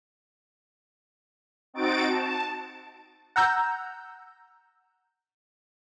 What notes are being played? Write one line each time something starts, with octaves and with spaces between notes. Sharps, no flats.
C4 D#4 F#4 A6 D7
A5
F#5 A#5 E6 G6